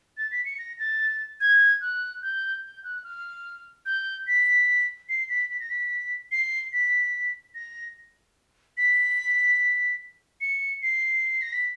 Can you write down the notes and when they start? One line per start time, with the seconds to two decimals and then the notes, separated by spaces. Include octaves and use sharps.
0.17 A6
0.31 B6
0.45 C#7
0.58 A#6
0.79 A6
1.41 G#6
1.81 F#6
2.23 G6
2.63 G6
2.84 F#6
3.04 F6
3.86 G6
4.27 B6
5.09 C7
5.29 B6
5.50 B6
5.60 A#6
5.70 B6
6.32 C7
6.73 B6
7.55 A#6
8.77 B6
10.41 C#7
10.82 C7
11.42 A#6
11.53 B6